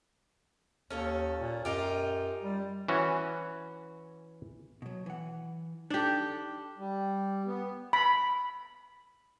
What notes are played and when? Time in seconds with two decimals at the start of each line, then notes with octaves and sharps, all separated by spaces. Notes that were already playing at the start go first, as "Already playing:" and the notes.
0.90 D#2 C#4 A4 C#5
1.39 A#2
1.65 F#2 D#4 F4 G4
2.42 G3
2.88 E3 C#4 F#4
4.82 B2 F#3
5.06 E3 F#5
5.90 D4 D#4 G4 A4
6.78 G3
7.47 B3
7.93 B5